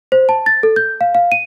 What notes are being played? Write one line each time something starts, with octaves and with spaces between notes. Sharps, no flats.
C5
A5
A6
A4
G6
F5
F5
D#7